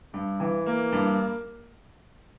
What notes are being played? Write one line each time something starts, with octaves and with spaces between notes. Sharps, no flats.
G2
E3
A#3
G2